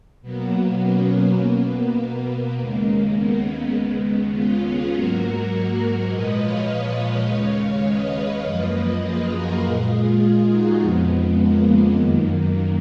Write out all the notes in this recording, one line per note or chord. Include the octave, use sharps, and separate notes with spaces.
B2 F#3 A#3 B3
A#3 C#4
B2 A#3 B3
A#3
D#2 C#3 G#3 A#3
A#3
B3
A#3
D#2 C#3 G#3 B3
C#4 F4
F4 G#4
G#2 F#3 A#3 F#4 A#4
A#2 F3 G#3 B4 D#5
C#5 F5
D#2 C#3 G#3
B4 D#5
F#2 F3 A#3
F4 G#4
F#4 A#4
A#2 G#3 F4 G#4
F4 G#4
D#4 F#4
F2 C#3 F3 G#3 B3
A#3
F#2 D#3 A#3